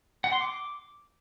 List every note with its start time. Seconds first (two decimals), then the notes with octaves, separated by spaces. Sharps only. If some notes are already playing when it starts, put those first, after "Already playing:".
0.24 F#5
0.32 C6
0.41 D6